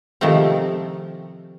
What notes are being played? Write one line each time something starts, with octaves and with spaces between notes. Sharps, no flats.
C3 D#3 F3 A3 C4